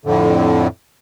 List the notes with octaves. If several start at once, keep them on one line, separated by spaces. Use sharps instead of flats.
F2 A2 D3